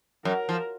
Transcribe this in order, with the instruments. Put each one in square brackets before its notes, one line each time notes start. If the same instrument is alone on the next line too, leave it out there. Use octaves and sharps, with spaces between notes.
[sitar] F#2 [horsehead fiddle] A#4
[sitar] F3